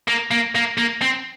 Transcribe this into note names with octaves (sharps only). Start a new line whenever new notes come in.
A#3
A#3
A#3
A#3
C4